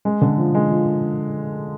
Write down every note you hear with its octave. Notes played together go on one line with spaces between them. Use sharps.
G#3
D3
F3
G#3
F3